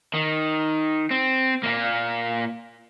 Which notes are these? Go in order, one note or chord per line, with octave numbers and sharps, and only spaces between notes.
D#3
C4
A#2 A#3